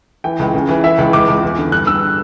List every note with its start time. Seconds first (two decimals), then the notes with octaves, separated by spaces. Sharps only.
0.24 E3 G5
0.39 C#2
0.54 C#3
0.69 E3
0.84 E3 E5
0.98 C#2
1.13 C#2 D6
1.28 C#2
1.43 E2
1.58 D3
1.72 G2 F#6
1.87 G2 E6